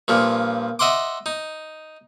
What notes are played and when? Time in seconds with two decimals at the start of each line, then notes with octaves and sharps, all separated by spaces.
0.08 G2 A#2 F3
0.79 D#5 E5 F#5 C6 D6
1.26 D#4